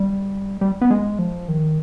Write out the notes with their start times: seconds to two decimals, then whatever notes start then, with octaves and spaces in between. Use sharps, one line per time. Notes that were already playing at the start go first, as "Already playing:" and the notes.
Already playing: G3
0.61 G3
0.81 B3
0.91 G#3
1.19 F3
1.48 D#3